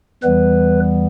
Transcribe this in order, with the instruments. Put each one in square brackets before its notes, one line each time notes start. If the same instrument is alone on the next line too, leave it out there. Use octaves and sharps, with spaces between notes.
[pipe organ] E2 E3 G3 B3 B4